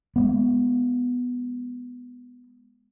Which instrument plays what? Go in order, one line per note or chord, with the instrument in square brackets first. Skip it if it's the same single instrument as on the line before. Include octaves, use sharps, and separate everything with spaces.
[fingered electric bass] G#3 A#3 B3